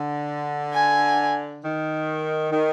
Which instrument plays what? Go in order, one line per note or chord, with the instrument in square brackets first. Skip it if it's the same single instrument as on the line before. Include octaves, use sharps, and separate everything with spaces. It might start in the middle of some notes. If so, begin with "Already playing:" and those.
Already playing: [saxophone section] D3
[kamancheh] G#5
[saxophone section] D#3
D#3